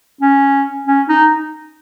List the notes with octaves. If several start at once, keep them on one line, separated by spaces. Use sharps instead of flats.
C#4
C#4
D#4